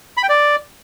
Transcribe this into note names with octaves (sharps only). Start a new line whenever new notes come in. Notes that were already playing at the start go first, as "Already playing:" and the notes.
B5
G5
D5